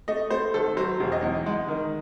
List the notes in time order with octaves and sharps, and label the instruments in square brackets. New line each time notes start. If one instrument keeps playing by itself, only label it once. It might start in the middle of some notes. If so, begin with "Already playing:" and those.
[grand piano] A3 D#5
A3 C5
G#1 A4
F#3 C5
E1
D#5
E2
G#3
D#3